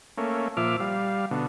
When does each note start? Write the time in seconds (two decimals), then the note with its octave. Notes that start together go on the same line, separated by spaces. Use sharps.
0.18 A3 A#3 C#4
0.57 A#2 F3 E5 D6 F6
0.80 G3 F5
1.31 B2 D3